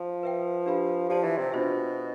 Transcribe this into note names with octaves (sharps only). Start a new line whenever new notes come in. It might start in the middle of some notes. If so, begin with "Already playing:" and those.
Already playing: F3
B4 E5 G5
D4 G4 B4 F5 B5
F3 G4 D5 A5 C6
E3
C3
B2 D4 F4 C5 E5